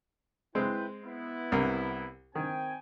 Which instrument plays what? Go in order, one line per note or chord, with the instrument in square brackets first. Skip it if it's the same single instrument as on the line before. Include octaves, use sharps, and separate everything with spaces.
[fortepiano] G#3 C4 [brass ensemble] E4 B4 G5
[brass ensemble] B3 E4
[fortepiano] C2 A#4
[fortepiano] D#3 [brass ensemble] C4 G5 G#5